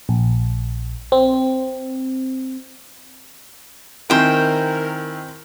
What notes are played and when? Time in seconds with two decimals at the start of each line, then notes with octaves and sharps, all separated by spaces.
0.09 A#1
1.12 C4
4.10 D#3 C4 E4 A#4 C5 G5 G#5